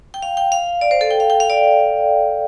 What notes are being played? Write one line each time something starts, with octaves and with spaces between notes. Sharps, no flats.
G5
F5
G5
F5
D5
C5
A4
G5
F5
G5
F5
D5